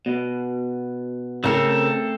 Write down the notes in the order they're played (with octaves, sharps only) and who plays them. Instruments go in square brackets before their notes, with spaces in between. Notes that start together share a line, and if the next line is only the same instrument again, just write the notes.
[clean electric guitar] B2
[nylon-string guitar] C#3 A#4 [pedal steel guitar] A3 C4 A4